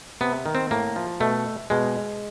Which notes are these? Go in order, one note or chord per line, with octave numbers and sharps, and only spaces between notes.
C3 B3
D#3
C4
A2 A#3
F3
B2 A3
B2 G#3